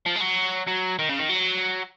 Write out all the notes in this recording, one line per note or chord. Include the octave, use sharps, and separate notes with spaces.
F3
G#3
F#3
F#3
D#3
C#3
D#3
F#3